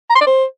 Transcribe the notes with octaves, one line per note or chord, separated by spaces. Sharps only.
A#5
C6
D5
C5